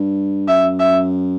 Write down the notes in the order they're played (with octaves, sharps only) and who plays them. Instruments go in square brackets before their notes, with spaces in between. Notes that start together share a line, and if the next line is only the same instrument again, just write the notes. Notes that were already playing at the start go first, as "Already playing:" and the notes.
Already playing: [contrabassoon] G2
[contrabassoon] F#2 [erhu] E5
[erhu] E5